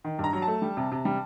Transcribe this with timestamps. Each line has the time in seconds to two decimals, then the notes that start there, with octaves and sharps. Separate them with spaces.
0.04 D#3
0.19 G2
0.24 A#5
0.33 F#3
0.42 A5
0.47 A3
0.62 G3
0.77 C3
0.92 C3
1.05 G3